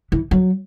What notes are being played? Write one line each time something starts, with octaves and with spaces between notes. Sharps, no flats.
E3
F#3